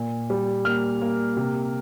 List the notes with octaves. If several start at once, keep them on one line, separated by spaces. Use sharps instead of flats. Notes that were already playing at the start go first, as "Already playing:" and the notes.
Already playing: A#2
G3
A#3 F6
A#3
C3